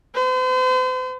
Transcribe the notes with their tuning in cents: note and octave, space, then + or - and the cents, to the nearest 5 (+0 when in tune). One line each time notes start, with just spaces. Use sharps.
C5 -40